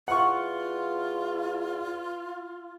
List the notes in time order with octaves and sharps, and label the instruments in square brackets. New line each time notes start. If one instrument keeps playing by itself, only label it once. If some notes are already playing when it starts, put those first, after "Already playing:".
[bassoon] E2 [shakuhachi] F4 [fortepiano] F#5 C#6